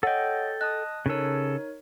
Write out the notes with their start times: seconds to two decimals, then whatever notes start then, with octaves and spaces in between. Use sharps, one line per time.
0.03 A4 C#5 D#5 F#5 G5
0.61 D#5 A5 D#6 F#6
1.06 C#3 D#4 A4 A#4 C#5